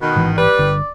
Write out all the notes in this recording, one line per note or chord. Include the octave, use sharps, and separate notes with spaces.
B2 D#3 B4
A1 G#2 E3
G3 B4 D5
G1 D3 D4